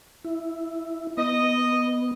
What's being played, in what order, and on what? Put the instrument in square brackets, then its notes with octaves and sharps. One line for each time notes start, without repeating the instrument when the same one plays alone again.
[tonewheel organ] E4
[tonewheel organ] B3 [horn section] D#5